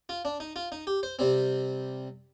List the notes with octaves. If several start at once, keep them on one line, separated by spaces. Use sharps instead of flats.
F4
D4
D#4
F4
D#4
G4
C5
C3 G3 C4